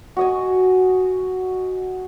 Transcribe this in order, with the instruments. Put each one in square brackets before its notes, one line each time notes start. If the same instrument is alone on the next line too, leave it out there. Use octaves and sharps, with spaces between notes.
[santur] F#4 D#5 G#5